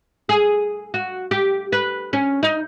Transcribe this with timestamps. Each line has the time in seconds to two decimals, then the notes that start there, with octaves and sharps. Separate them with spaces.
0.29 G#4
0.94 F#4
1.31 G4
1.72 B4
2.13 C#4
2.43 D#4